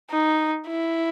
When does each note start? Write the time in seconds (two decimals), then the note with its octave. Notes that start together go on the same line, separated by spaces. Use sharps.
0.11 D#4
0.68 E4